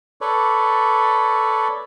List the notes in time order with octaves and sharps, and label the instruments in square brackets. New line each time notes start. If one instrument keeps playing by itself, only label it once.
[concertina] A4 B4 C#5 D5